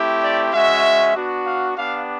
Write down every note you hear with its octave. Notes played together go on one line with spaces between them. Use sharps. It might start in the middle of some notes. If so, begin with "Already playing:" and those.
Already playing: A3 C4 E4 G4
D5
G#3 C#4 F#4 E5
B3 D4 F#4
F5
B3 D4 G4 F5